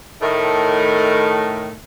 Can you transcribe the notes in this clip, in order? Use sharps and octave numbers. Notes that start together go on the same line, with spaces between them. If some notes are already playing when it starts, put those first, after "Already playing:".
A2 D#3 A3